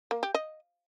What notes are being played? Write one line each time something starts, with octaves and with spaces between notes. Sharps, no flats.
A#3
G4
D#5